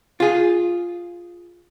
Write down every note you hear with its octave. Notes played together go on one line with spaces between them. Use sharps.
F4 G#4